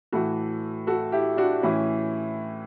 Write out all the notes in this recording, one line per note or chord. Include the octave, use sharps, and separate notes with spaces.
A2 E3 F#4 A4
F#4 A4
E4 G4
D4 F#4
A2 E3 C#4 E4